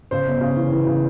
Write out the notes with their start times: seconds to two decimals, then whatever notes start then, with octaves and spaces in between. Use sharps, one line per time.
0.11 C#3 C5
0.27 G1
0.41 C#3
0.56 E3
0.72 E3
0.87 C#3